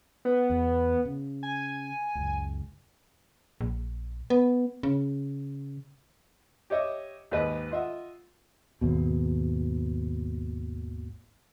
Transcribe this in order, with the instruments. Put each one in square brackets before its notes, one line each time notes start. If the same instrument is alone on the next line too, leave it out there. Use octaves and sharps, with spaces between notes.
[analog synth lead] B3
[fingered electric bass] E2
C#3
[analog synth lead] G#5
[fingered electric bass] F#1 C#2
[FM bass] A#1
B3
C#3
[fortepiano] G4 C#5 D#5 E5
D#2 G#2 B4 D#5
F4 D#5 E5 F#5
[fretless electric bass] G#1 D#2 B2